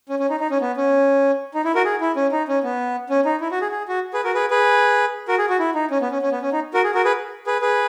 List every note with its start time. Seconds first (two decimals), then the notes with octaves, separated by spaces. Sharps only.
0.09 C#4
0.19 C#4
0.30 D#4
0.40 D#4
0.50 C#4
0.61 B3
0.77 C#4
1.54 D#4
1.65 E4
1.75 F#4 A#4
1.85 G#4
2.01 E4
2.16 C#4
2.32 D#4
2.48 C#4
2.63 B3
3.10 C#4
3.25 D#4
3.41 E4
3.51 F#4
3.61 G#4
3.72 G#4
3.88 F#4
4.14 G#4 B4
4.24 F#4 A#4
4.34 G#4 B4
4.51 G#4 B4
5.28 F#4 A#4
5.39 G#4
5.50 F#4
5.59 E4
5.75 D#4
5.91 C#4
6.01 B3
6.11 C#4
6.22 C#4
6.32 B3
6.42 C#4
6.52 D#4
6.74 F#4 A#4
6.84 G#4
6.95 F#4 A#4
7.04 G#4 B4
7.47 G#4 B4
7.61 G#4 B4